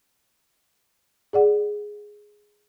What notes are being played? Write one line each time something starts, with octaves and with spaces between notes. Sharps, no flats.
G#4 D5 F#5